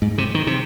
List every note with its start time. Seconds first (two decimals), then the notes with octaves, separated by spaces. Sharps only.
0.02 G#2
0.18 C3
0.35 D#3
0.47 C3